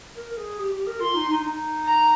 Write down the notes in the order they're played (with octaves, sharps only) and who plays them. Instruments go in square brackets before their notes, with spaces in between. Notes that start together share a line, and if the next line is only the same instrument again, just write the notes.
[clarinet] A#4
A#4
G#4
G4
G4
A#4
[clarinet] F4 [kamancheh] C6
[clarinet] D#4
D#4
D#4
[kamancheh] A#5